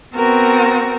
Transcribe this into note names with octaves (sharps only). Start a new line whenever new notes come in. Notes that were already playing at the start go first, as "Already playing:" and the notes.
B3 C4 F#4 A#4